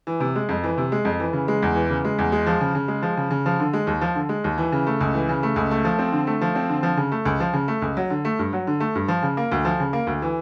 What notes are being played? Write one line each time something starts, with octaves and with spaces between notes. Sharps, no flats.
E3
C3
G#3
F2
E3
C3
G#3
F2
E3
C#3
G#3
E2
E3
C#3
G#3
E2
G#3
F3
C#3
C#3
G#3
F3
C#3
C#3
F3
D3
G#3
D#2
F3
D3
G#3
D#2
E3
C#3
A3
C#2
E3
C#3
A3
C#2
A3
F3
C4
D3
A3
F3
C4
D3
F3
C#3
A3
C#2
F3
C#3
A3
C#2
F#3
D3
A3
G2
F#3
D3
A3
G2
F3
C#3
A#3
D2
F3
C#3
A#3
D2
E3